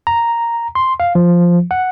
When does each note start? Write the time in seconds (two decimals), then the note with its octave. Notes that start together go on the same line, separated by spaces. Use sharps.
0.07 A#5
0.75 C6
1.00 F5
1.15 F3
1.71 F#5